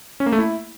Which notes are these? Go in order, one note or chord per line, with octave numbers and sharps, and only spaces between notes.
C#4
A#3
A3
E4